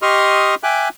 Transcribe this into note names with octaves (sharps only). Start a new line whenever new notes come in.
G4 D#5 C6 C#6 D#6 F6
E5 G5 G#5 D6 F#6